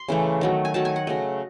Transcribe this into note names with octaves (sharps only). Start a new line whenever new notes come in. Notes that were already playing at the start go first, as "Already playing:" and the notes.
Already playing: C6
C#3 E3 A3
D#3 F#3 A3
G#5
D#3 F#3 A3 A5
G#5
F#5
C#3 F#3 A3 D#5